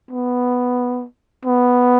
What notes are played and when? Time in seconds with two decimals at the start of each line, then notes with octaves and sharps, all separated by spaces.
0.11 B3
1.45 B3